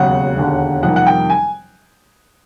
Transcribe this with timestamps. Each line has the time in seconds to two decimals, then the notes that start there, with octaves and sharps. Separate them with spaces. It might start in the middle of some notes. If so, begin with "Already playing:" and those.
Already playing: E1 D#2 C#3 F#3 F#5
0.36 E1 D#2 D3
0.83 F2 C3 D#3 G3 A#3 F#5
0.96 F#5
1.07 G5
1.30 G#5